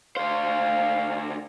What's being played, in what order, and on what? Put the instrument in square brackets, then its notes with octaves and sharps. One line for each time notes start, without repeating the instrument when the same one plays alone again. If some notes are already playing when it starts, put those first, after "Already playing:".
[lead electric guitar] D2 C5 [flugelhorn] F5